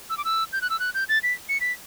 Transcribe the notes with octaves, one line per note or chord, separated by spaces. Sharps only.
E6
D6
E6
G6
F#6
E6
F#6
G6
A6
B6
C#7
B6